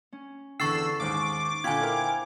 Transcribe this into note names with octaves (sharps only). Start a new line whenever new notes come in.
C#4
E2 D3 C#6 E6 A6 C7
D#2 G#2 D6
A#2 D3 F5 G5 G#5 B5 G#6
E4 A#4 C5